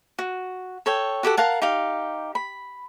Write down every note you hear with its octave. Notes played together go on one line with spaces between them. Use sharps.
F#4
A4 C#5 G5
F#4 G4 A4 F#5
A#4 F5 F#5 A5
D#4 G4 F5
B5